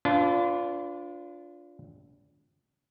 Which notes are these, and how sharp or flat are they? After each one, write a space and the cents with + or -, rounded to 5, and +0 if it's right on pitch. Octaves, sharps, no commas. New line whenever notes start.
D4 -25 F4 +0 B4 +35